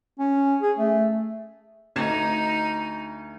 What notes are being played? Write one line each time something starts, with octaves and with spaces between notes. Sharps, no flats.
C#4
G#4
A3
D2 D#4 G#6 E7